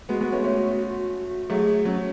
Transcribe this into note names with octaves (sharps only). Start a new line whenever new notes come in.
G#3 B3 F#4
G#3 B3
A3 C#4
A3 C#4
F#3 A3 G#4
F#3 C#4